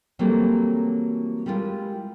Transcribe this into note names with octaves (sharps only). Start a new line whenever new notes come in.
E3 F#3 G3 A3 A#3 C4
G3 G#3 E4 F4 A#4